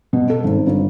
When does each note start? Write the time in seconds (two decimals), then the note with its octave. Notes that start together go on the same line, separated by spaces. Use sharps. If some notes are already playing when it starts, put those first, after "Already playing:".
0.13 B2
0.30 A4
0.44 G#1
0.66 G1